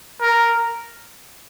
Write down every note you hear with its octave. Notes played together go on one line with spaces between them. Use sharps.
A#4